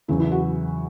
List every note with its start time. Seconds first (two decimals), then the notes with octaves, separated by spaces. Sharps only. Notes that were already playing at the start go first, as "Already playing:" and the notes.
0.08 E2 C#3 F#3 E4
0.20 E4
0.32 F#4